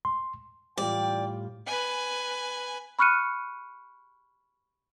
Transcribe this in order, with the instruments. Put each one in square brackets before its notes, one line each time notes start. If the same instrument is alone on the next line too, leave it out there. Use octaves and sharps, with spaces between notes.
[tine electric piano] C6
[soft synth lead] A2 [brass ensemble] E3 G5 [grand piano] G3 F4 [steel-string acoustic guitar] D5
[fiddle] B4 G#5
[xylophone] B5 C#6 F6 F#6 C#7 D#7